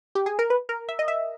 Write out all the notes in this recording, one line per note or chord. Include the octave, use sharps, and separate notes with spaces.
G4
G#4
A#4
B4
A#4
E5
D#5
E5